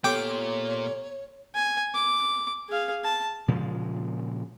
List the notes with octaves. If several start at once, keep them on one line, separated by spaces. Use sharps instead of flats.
A#2 B3 F4 G4 A4 C#5 G5 D6
G#5
D6
G#4 F5
A5
A#2 C#3 F3 G#3